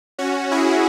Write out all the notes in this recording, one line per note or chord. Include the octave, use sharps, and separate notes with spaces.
C#4 F#4
E4 G#4